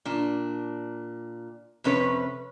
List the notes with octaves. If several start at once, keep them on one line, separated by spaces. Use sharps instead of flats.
A#2 D4
F2 C3 C#4 B4